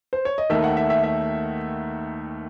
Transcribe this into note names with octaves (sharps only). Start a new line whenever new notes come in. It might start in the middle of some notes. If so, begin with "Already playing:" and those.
C5
C#5
D#5
D#2 D#3 A3 E5
F#5
E5
E5
E5